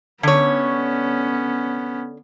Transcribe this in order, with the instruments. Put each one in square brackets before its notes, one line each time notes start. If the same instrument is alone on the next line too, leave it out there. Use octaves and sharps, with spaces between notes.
[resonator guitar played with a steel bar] D3 C#5 [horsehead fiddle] B3 C#4